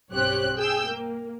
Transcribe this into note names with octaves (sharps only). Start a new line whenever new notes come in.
B1 G2 C4 G4 C#5 F#6
G#4 G5 E6 G6
A#3